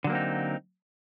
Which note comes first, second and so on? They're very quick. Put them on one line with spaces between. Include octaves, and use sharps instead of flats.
D3 F#3 A#3 C4 D#4